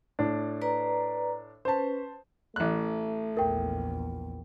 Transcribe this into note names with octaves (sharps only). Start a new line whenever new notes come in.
A2 D4
B4 D5 A#5
C#4 B4 C5 A5
A1 A3 F#6
A#1 E2 A#4 G5